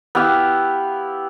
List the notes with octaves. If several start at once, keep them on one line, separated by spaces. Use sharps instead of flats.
B3 E4 G4 F5